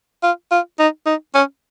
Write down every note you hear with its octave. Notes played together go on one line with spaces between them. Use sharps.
F4
F4
D#4
D#4
C#4